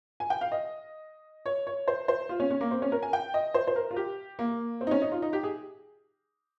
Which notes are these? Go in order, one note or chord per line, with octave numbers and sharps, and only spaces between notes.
G#5
G5
F5
D#5
C#5
C#5
C5
C5
F4
C#4
C#4
A#3
C4
C#4
A#4
G#5
G5
D#5
C5
C5
A#4
F4
G4
A#3
C4
D#4
C#4
D#4
F4
D#4
G4
G#4